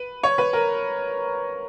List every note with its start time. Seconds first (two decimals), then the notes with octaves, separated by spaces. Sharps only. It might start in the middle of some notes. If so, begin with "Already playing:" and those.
Already playing: B4
0.23 C#5
0.38 B4
0.53 A#4